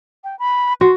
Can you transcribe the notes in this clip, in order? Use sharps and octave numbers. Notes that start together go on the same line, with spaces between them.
G5
B5
F#4 C6